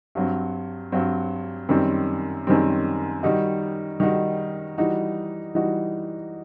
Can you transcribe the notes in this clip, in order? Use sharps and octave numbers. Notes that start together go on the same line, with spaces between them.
G2 F#3 C4
G2 F#3 C4
F#2 D#3 G3 C4
F#2 D#3 G3 C4
D#3 G3 D#4 F#4
D#3 G3 D#4 F#4
E3 G3 D#4 F#4
E3 G3 D#4 F#4